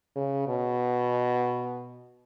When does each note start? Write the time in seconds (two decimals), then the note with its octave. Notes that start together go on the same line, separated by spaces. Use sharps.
0.16 C#3
0.48 B2